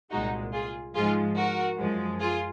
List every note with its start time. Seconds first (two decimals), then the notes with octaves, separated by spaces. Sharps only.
0.11 C2 A#2 G#3 D#4 F#4
0.52 F4 G#4
0.95 G#2 F3 G#3 F4 G#4
1.36 F#4 A#4
1.78 F#2 F3 G#3
2.19 F4 G#4